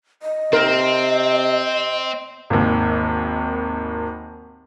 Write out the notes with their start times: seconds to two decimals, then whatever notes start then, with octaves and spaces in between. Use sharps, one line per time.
0.23 D#5
0.53 C3 C4 A#4
2.50 G#1 D#2